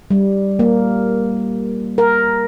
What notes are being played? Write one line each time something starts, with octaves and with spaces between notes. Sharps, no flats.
G3
A#3
A#4